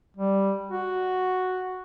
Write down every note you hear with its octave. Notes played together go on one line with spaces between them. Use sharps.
G3
F#4